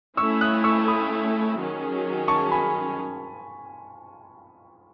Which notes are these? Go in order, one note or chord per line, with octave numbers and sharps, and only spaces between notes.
A3 C#4 E4 C#6 E6
D#6 F#6
C#6 E6
B5 D#6
D#3 F#3 C#4 G#4
A5 C#6
G#5 B5